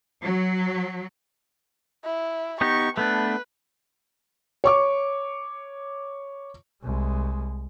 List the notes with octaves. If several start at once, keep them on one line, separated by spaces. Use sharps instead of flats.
F#3
E4
B3 D#4 G4 C#6
A3 B3 D4 B4
C#5 C#6 D6
C2 G#3